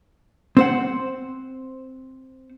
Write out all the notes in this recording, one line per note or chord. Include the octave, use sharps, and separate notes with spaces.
C4 C5 F#5